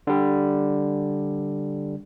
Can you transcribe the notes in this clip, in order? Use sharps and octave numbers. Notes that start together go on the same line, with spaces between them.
D3 G3